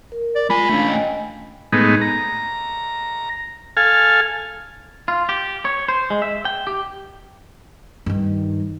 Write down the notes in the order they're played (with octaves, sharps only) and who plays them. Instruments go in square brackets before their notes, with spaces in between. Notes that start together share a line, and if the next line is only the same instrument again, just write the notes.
[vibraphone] A#4
[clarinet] D5
[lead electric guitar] G#3 G#5 [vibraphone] F4 [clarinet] B5
[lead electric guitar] A3 C#4 [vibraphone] D4 F5
[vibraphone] D#5 G5 G#5
[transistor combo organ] A2 G#3 B3 D#4
A#5
A4 F5 G#5
[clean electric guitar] F4
G4
C#5
C5
G#3
E5
G5
G4
[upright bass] G2 D#3